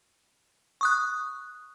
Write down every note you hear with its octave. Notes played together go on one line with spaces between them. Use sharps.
C#6 D#6 F#6